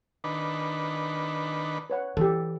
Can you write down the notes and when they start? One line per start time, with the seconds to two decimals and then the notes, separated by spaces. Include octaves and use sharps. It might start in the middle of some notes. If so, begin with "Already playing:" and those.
0.24 D#3 D4 B4
1.90 B4 C#5 F#5
2.17 E3 G4 A4